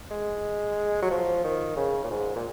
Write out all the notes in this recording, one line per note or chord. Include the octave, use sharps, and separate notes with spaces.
G#3
F#3
F3
D#3
C#3
A#2
G#2
A#2